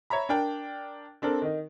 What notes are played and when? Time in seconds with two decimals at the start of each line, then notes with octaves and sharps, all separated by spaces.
0.10 C#5 E5 A#5 B5
0.29 D4 A#4 G5
1.22 C4 D4 A4 A#4
1.42 D#3 D#4